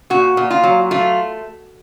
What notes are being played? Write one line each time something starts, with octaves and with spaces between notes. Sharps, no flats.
A#2 F#4
A#2
F4
F#3
A3 F4